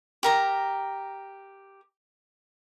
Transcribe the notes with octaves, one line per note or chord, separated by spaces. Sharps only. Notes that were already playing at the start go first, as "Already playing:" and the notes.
G4 A#4 A#5